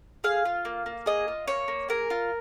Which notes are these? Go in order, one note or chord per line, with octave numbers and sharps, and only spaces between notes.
G#4 F5
F4
A#3
A#3
G#4 D#5
F4
A#3 C#5
A#3
G#4 A#4
F4